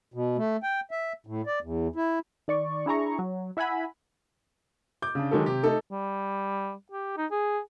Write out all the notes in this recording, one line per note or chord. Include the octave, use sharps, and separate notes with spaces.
B2
A3
G5
E5
A2
D5
E2
E4
D#3 D5 C#6
D4 E4 G#4 A#5 C#6
F#3
E4 E5 F#5 G#5 B5
D6 G6
C#3 D4
D#3 F#3 G#3 G4 A4
C3 G4
A3 D#4 A4
G3
G4
D#4
G#4